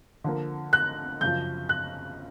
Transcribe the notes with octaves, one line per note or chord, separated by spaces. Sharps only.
D3 F3 A#3
F#6
F#2 C#3 F3 G6
F#6